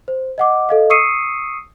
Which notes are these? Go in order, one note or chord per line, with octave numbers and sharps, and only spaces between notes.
C5
D#5 F#5 D6
A4 D#5 F5
C#6 D#6 E6 C7 C#7 D#7